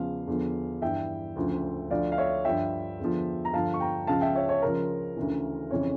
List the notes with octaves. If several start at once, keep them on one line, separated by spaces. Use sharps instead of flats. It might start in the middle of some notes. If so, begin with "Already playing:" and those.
Already playing: E2 C#3 F3 F5
E2 D3 F3
G2 E3 E5 G5
D2 C#3 F3
D2 D3 F3 D5 F5
F5
C#5 E5
G2 F3 E5 G5
E2 D3 F3
A#5
G2 D3 F3 F5 A5
C#6
G5 A#5
C#2 C#3 F3 F5 A5
E5 G5
C#5 E5
C#5
C#2 C#3 F3 A#4
D2 C#3 E3
F2 C#3 E3 C#5